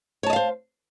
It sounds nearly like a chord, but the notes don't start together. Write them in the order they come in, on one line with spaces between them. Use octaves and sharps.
C#5 A5 D#5 F5 C5